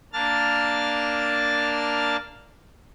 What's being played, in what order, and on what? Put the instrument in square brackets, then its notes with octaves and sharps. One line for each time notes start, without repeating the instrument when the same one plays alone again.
[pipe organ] A#3 D4 A5 F6 A6